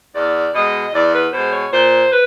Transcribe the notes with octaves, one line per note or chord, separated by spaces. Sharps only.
E2 D5
B2 G#3 D#5
E2 D5
B4
B2 G#3 C5
C#5
A#2 C5
B4